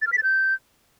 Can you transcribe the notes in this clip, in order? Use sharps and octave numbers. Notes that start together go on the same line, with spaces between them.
A6
F6
B6
A6
G6